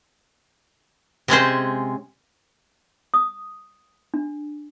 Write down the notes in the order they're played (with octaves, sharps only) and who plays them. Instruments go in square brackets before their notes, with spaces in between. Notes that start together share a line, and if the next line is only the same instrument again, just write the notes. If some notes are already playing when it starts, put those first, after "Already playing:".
[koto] C3 G#3 C#4 C5
[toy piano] D#6
D4